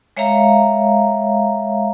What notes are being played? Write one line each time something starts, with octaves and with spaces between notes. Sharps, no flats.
G#3 C#5 E5 F5 A#5